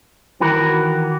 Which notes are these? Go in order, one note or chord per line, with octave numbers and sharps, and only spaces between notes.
D#3 E3 F#4 A#4